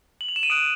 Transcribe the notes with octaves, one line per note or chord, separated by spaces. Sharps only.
F#7
F7
E7
D#7
D#6 F#6 D7